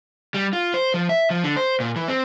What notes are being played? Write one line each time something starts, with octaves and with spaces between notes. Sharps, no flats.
G3
F4
C5
F3
E5
F3
D3
C5
A#2
E3
C4